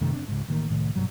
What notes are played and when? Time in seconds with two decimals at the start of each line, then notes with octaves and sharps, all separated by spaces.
0.01 F#2 C3 D#3 A3
0.13 F#1 C4 D4
0.28 C#2 G#2
0.48 A1 D#3 A#3
0.70 C2 A2 D#3 A3
0.96 A#1 G2 B2 F#3